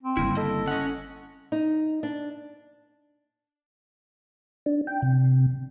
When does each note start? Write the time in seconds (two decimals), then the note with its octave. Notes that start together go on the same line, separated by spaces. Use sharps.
0.03 C4
0.17 G1 C#3 G3 A#3 E4
0.37 A4 D#5
0.68 C#4 D#5 F#5
1.52 D#4
2.03 D4
4.66 D4
4.87 G5
5.02 C3